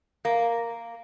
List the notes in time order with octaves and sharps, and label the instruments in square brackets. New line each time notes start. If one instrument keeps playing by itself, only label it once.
[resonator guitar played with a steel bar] A#3